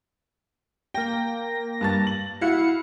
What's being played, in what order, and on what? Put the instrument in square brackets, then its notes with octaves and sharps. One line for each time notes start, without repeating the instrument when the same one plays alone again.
[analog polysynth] A#3 A#6 [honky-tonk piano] G5
[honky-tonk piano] G2 A5 A6
F#7
[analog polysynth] E4 F#5 C#7 [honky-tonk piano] F#4 F5